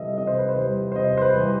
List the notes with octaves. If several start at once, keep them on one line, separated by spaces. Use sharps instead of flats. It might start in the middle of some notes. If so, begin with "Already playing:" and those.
Already playing: C3 E3 G3 A4 D#5 E5
C3 D#5
C5
B4
C5
E3 G3
C5
C3 D#5
C5
B4
E3 G3